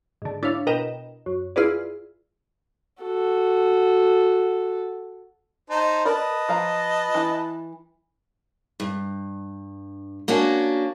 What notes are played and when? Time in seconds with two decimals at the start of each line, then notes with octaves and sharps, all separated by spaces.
0.22 G#2 D3
0.43 D4 E4 C#5 F5
0.67 B2 A#4 B4 D#5 G5 E7
1.26 F#2
1.56 E4 F4 G#4 B4 D5
3.02 F#4 A4
5.70 D#4 C5 A5
6.05 A#4 B4 D5 D#5 A5 B5
6.49 F3 F5 A#5
7.14 E3 E4
8.80 G2
10.28 A#3 C#4 D4 F#4